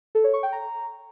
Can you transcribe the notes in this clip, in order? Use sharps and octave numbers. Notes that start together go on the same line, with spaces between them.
A4
C#5
C#6
G5
A#5